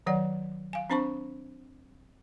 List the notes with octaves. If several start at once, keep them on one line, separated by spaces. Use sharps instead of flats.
D#3 F#3 C#5 D5 F#5
F5 G#5
C4 D4 C5 A5 B5 C#6